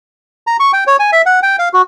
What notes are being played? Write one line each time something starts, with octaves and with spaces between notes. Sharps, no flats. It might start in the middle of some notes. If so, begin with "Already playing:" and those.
A#5
C#6
G5
C#5
G#5
E5
F#5
G5
F5
F#4